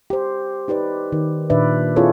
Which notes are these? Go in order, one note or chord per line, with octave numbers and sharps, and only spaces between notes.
G4 C5
D#4 G4 B4 D5
D#3
A#2 D#3 D4 B4 D5 E5
C4 E4 F4 G#4 A4 C#5